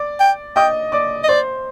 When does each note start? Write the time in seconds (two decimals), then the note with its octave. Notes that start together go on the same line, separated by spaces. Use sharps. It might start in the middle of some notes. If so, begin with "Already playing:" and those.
Already playing: D5 D6
0.20 G5
0.56 D#5 G5 D#6
0.92 D5 D6
1.24 D#5
1.29 C5 D5 C6